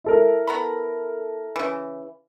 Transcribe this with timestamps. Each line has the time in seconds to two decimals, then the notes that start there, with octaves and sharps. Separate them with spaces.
0.04 E4 A4 A#4
0.47 B3 A#5 B5
1.56 C#3 E3